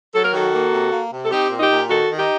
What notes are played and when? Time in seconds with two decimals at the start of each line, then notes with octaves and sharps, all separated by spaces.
0.15 F#3 A4
0.25 A#4
0.34 D#3 F#4 A4
0.54 A#3
0.73 C3
0.92 A#3
1.12 C3
1.25 A4
1.31 C4 D#4 G4
1.51 A#2
1.60 D#4 G4
1.70 A#2
1.89 D#3 F#4 A4
2.08 D#3
2.18 D#4 G4